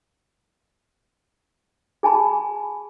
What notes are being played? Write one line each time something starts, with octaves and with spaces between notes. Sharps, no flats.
G#4 G#5 A5 B5